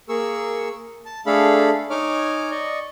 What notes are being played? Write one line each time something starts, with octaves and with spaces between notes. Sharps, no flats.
A#3 G#4 A#4 C#6 E6
A5
A3 D4 G#4 A4 F5 B5
D#4 C#5 G#5 D6 F6
D5 D#5 C#6